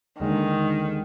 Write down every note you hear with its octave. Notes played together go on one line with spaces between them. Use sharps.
D#2 D3 D#3 G#3